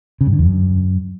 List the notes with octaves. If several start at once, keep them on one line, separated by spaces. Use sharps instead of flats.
C#3
G2
D3
E2
F#2